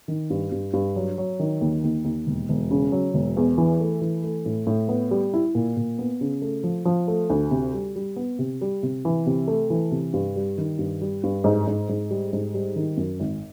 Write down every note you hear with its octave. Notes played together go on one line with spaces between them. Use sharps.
D#3
G2
G2
G2
F#3
F#3
D#3
D#2
D#2
D#2
E1
E1
C#3
F#3
E1
E2
E3
A3
E3
A3
A2
A2
B3
G3
E4
A#2
A#2
B3
C#3
A3
F3
F3
A3
D2
C3
G3
G3
B3
C3
G3
C3
E3
C3
A3
E3
C3
G2
G3
D#3
G2
G3
G2
G#2
G#2
G#2
G3
G#2
G3
D#3
F#2
G#1